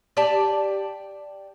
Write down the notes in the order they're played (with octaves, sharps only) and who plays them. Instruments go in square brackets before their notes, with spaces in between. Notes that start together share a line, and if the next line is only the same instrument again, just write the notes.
[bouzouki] G4 D5 G5 A5